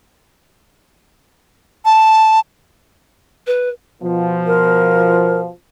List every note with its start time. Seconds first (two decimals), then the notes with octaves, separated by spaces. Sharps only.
1.85 A5
3.47 B4
4.02 B2 F3
4.46 A#4